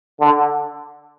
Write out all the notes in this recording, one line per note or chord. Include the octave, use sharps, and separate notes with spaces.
D3